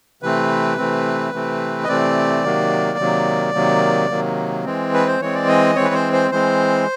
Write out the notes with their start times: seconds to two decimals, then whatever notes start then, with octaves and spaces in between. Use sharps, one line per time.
0.23 C3 E3 A3 C4 B4
0.78 C3 E3 A3 C4
1.33 C3 E3 A3 C4
1.84 D#5
1.88 C3 E3 A3 C4 D5
2.44 C3 D#3 F#3 A#3
2.99 C3 D#3 F#3 A#3
3.54 C3 D#3 F#3 A#3
4.10 C3 D#3 F#3 A#3
4.65 E3 G#3 C4
4.94 B4
5.07 C5
5.20 E3 G#3 C4 C#5
5.35 D5
5.48 D#5
5.75 E3 G#3 C4 C#5
5.85 B4
5.94 C5
6.13 C5
6.31 E3 G#3 C4 C5